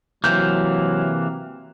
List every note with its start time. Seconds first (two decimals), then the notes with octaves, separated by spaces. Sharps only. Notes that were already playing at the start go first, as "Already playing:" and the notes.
0.24 C3 E3 F#3 A#3 G6